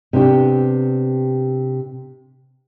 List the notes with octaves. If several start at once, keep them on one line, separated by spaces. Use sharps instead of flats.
C3 B3 D4 G4